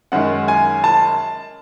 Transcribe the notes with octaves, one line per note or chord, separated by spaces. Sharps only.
F#2 D#3 G#3 F#5
G#5
A5